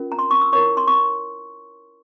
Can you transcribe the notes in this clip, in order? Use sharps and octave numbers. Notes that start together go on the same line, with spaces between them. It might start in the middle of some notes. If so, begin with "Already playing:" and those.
Already playing: C#4 F4 A#4
A#5
C6
C#6
E6
E4 A#4 C#5 C#6
C6
C#6